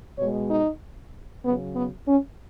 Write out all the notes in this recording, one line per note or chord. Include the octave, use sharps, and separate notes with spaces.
B2 G#3 C#5
D#4
C#3 F#3 B3
B3
C#4